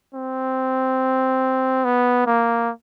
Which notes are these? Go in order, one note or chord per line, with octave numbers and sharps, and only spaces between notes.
C4
B3
A#3